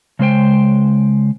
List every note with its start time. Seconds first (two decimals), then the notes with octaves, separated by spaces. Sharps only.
0.19 C#3 G#3 C5 G5